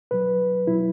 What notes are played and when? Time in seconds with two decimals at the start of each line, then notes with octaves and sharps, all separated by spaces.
0.11 B2 F#3 B4
0.67 B2 F#3 E4